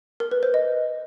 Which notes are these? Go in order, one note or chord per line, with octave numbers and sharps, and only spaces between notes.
A#4
B4
C5
D#5